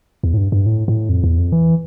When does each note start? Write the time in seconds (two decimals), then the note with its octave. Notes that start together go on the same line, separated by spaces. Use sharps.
0.23 E2
0.34 A2
0.37 G2
0.52 G2
0.66 A2
0.88 A2
1.09 F2
1.24 E2
1.38 F2
1.52 E3